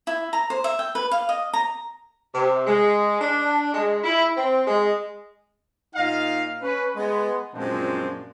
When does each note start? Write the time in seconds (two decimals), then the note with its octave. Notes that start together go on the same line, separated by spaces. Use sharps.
0.07 E4
0.33 A#5
0.50 C5
0.64 E5
0.79 G5
0.95 B4
1.11 F5
1.29 D#5
1.53 A#5
2.34 C3
2.67 G#3
3.21 D4
3.74 G#3
4.04 E4
4.37 C4
4.67 G#3
5.95 A#2 D#4 D#5 F5
6.61 C#4 B4
6.96 G#3 B3
7.54 F#2 A#2 F3 G#3 C4 D4